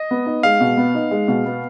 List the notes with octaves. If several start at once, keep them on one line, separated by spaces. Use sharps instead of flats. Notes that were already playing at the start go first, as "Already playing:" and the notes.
Already playing: D#5
B3
D#4
G#3 F5
B2
B3
D#4
G#3
B2
B3